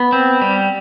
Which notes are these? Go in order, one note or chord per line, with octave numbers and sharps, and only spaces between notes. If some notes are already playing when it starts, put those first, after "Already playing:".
Already playing: B3
C4
G3